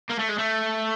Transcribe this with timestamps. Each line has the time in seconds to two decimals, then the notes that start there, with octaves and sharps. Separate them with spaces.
0.10 A#3
0.19 A3
0.29 G#3
0.39 A3